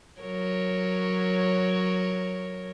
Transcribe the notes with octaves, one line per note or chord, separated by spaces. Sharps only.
F#3 A#4 C#5